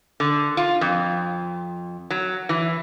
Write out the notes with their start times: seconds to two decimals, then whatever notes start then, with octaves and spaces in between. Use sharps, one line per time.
0.20 D3
0.57 F4
0.81 F2
2.10 F#3
2.49 E3